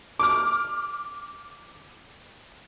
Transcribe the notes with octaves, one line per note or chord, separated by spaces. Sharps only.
D6 F6